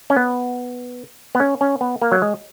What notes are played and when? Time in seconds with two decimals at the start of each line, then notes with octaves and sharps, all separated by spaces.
0.10 C#4
0.17 B3
1.35 B3
1.40 C#4
1.61 C#4
1.81 B3
2.02 A#3
2.12 F#3
2.22 G#3